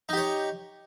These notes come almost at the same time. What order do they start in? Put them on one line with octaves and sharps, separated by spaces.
D#4 G4 C#5